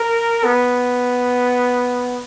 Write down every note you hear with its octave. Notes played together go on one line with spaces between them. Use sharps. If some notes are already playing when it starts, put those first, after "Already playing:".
Already playing: A#4
B3